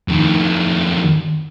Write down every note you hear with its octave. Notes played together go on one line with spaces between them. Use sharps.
F2 D#3